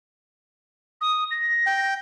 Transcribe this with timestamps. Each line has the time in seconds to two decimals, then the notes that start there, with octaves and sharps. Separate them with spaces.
1.01 D#6
1.31 A#6
1.66 G5